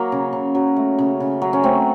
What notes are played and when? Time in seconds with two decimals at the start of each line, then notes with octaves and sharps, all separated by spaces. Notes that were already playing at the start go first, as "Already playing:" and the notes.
Already playing: F#3 A#3
0.12 C#3
0.33 C#3
0.55 F#3
0.76 A3
0.99 C#3
1.20 C#3
1.42 F#3
1.53 C#4
1.63 A3 C4